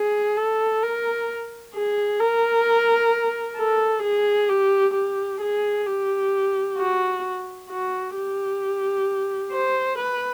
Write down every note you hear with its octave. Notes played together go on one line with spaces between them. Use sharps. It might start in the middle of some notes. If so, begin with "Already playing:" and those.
Already playing: G#4
A4
A#4
G#4
A#4
A4
G#4
G4
G4
G#4
G4
F#4
F#4
G4
C5
B4